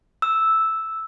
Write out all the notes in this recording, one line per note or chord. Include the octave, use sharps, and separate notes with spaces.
E6